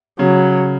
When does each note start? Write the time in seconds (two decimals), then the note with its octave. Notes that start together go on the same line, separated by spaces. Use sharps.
0.19 C#3 F#3